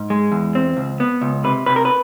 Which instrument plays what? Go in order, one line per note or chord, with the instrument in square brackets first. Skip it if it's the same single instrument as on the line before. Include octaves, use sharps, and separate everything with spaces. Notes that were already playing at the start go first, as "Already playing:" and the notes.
Already playing: [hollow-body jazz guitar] G#2
G#3
E2
C4
C#2
B3
C#2
C3 B4
C3 B4
A#4
B4